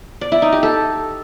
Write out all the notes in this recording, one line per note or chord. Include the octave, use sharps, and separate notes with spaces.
D5
E4
D#4
G4
A4